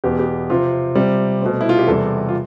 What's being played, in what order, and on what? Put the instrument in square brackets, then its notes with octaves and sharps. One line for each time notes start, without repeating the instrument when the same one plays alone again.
[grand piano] E2 B2 B3 G4
G4
C3 F3 C4 F4
C3 G3 C4
B2 A3 C4
E4
F4
G4
E2 C3 G3 A4
F4